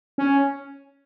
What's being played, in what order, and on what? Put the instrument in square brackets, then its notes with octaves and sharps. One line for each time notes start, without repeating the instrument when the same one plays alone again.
[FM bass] C#4